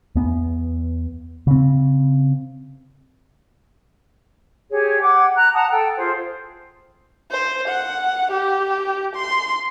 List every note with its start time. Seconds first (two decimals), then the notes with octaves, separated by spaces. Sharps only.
0.15 E2 B3
1.47 C#3 C4
4.69 G4 G#4 C#5
5.00 F#5 G5 D6
5.34 A#5 F#6
5.53 F#5 A5 A#5 D#6
5.70 A4 G5
5.95 F4 G#4 C5
7.31 C5
7.68 F#5
8.32 G4
9.16 C6